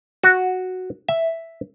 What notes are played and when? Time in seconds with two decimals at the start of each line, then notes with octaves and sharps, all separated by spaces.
0.24 F#4
1.09 E5